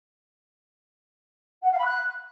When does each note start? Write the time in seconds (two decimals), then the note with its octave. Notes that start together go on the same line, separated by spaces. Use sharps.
1.63 F#5
1.70 F5
1.77 B5
1.84 F#6